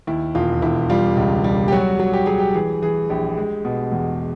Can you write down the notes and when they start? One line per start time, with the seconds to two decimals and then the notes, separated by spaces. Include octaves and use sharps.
0.07 D#2 E4
0.35 E1 F4
0.62 E1 E4
0.90 G3 F4
1.17 C#2
1.44 G3
1.68 G4
1.72 F#3 F#4
2.00 F#3
2.13 G4
2.26 F#3 G#4
2.39 G4
2.54 E3 G#4
2.82 E3 G#4
3.10 A#1 G4
3.37 G#3
3.65 B2
3.92 E2